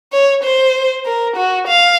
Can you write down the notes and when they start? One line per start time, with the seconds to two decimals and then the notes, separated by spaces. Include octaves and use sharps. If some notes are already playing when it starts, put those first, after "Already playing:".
0.12 C#5
0.43 C5
1.05 A#4
1.36 F#4
1.67 F5